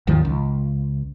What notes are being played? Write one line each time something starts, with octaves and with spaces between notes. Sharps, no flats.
G#1 D#2 D#3 F3
C#2